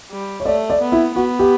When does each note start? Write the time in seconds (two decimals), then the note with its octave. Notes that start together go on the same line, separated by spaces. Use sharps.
0.11 G3
0.40 C#5
0.45 A3 D5
0.70 D5
0.81 B3
0.92 E4
1.15 B3 F#4
1.39 G4